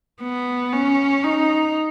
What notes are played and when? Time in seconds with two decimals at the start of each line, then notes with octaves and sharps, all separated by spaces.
0.22 B3
0.73 C#4
1.24 D#4